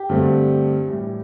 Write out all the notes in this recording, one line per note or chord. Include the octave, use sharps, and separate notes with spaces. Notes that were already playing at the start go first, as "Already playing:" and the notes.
Already playing: G4
G2 D3 A3 C4
A2 E3 G3